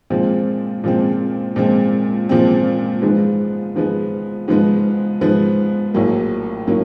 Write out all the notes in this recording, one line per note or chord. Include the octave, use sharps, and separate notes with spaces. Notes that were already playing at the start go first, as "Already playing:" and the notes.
A#2 F3 G#3 C4
A#2 F3 G#3 C4
A#2 F3 G#3 C4
A#2 F3 G#3 C4
G#2 F3 G#3 B3
G#2 F3 G#3 B3
G#2 F3 G#3 B3
G#2 F3 G#3 B3
A#1 A2 F#3 A#3
A2 F#3 A#3